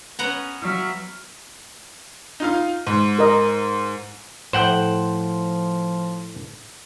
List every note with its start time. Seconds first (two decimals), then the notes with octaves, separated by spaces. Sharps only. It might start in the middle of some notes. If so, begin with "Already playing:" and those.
0.19 B3 C#4 F#5 A#5
0.62 F#3 E5 F5 F6
2.40 D#4 F4 F5
2.87 G#2
3.19 A#4 D#5
4.53 A2 F3 C5 F#5 G5